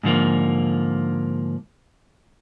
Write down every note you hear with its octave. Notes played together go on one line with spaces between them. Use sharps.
G#2 D3 F3 A#3